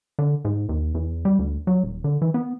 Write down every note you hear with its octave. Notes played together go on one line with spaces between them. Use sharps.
D3
G#2
D#2
E2
G3
D2
F#3
D#1
D3
E3
B3